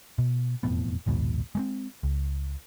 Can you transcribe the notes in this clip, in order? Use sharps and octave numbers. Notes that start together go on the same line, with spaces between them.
B2
E1 F2 A2 B3
A#1 D#2 G#2 B2
G#3 A3 C4
C#2